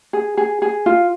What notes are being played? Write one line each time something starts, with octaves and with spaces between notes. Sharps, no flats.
G#4
G#4
G#4
F4